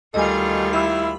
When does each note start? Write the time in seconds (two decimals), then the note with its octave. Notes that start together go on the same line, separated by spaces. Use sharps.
0.14 D2 D#3 G3 F4 A4 D#5 G#5
0.73 E4 B5 E6